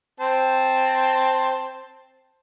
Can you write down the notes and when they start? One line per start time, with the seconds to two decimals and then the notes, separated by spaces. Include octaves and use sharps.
0.20 C4 C5 A5